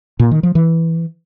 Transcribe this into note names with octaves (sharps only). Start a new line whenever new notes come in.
A#2
D#3
F3
E3